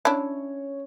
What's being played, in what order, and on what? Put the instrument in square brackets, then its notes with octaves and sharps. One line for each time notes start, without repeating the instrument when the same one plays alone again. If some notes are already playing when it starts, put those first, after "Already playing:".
[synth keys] C#4 C#5 [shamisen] D4 E4